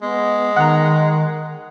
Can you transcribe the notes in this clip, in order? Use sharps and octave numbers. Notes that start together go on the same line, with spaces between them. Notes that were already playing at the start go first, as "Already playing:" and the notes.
G#3 B3
D#3 F#5 A#5